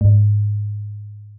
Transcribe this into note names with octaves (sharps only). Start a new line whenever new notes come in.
G#2